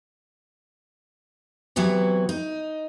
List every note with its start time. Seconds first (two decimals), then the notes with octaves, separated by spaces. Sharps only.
1.76 C3 E3 F#3 B3 F#4
2.29 D#4